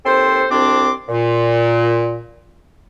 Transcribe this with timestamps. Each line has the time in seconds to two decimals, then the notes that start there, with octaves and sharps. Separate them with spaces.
0.05 D#2 C4 A4 C5 C6
0.50 C2 F2 C4 D4 C6 D6
1.09 A#2